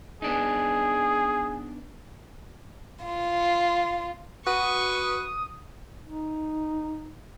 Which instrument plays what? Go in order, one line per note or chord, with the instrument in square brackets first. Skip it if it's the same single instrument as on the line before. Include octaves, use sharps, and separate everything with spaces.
[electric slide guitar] B3 D4 D#4 [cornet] G#4
[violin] F4
[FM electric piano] F#4 [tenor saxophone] B4 [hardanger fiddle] C#6 [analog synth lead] D#6
[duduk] D#4